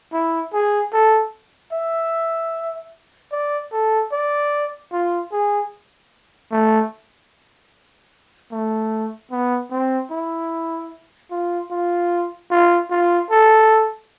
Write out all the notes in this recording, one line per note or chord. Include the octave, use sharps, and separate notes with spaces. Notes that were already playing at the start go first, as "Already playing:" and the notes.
E4
G#4
A4
E5
D5
A4
D5
F4
G#4
A3
A3
B3
C4
E4
F4
F4
F4
F4
A4